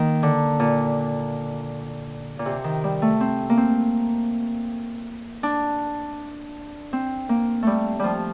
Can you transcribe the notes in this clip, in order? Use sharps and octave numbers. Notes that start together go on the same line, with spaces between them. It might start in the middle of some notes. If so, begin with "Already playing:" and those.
Already playing: D#3 A#3
D3
A#2
A#2
C3
D#3
G3
A3
C4
A#3
C4
D4
C4
A#3
G3 A3
F3 G3